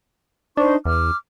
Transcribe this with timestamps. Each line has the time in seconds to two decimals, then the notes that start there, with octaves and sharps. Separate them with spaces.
0.57 D4 D#4 C5 C#6
0.85 E2 D6 F6